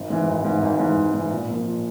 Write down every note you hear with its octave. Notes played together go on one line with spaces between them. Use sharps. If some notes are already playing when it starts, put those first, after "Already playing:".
Already playing: G#1
G#2 E3
G#1
G#2 E3
G#1
G#2 E3
G#1
G#2 E3
A#2
F3 A#3
A#2